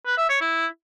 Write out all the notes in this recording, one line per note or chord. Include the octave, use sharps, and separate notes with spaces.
B4
E5
C#5
E4